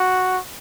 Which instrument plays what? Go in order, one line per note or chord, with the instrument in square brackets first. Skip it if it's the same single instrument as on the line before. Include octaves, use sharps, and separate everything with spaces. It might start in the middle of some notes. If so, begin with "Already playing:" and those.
Already playing: [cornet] F#4